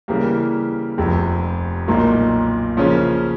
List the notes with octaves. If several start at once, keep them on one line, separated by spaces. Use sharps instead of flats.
C#3 E3 G3 A#3
F1 F2 C3
B1 A#2 F#3 A#3 D#4
C#3 F3 A#3 C#4